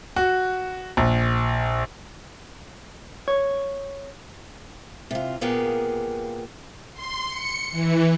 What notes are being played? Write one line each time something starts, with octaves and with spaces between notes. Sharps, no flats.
F#4
A#1
C#5
C3 F4
A#2 A#3 B3 G4 G#4
C6
C#7
E3